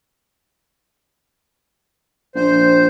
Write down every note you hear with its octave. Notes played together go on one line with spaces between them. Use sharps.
A#1 C5